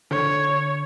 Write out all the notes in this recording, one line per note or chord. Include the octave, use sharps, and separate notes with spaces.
D3 C#5